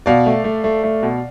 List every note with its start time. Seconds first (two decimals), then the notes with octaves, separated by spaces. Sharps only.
0.06 B2 D5 F5
0.26 A3
0.44 A3
0.64 A3
0.84 A3
1.03 B2